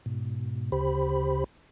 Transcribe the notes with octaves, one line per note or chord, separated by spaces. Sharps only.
G#2 B2
D2 C#3 G4 C5 B5